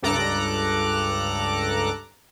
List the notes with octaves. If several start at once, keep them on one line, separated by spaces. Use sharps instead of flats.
C#2 G2 A4 A#5 D6 F#6